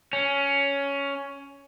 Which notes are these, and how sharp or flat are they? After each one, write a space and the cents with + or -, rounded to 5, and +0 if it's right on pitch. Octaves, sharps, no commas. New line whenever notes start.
C#4 +10